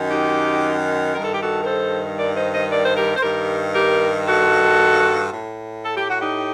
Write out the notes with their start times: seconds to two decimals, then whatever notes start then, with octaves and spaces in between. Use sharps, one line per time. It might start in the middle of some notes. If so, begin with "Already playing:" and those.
Already playing: F#2 D#3
0.10 D#4 G4
1.15 G2 D#3 A#4
1.25 A4
1.34 G4
1.42 F#4 A4
1.62 A#4
1.66 A4 C5
2.19 A#4 D5
2.36 C5 D#5
2.53 C5 D#5
2.71 A#4 D5
2.85 C5
2.97 G4 A#4
3.16 C5
3.23 G2 D#3 G4 A#4
3.75 G4 A#4
4.28 F#4 A4
5.31 A2
5.84 A4
5.97 G4
6.10 F#4
6.21 D#4 G4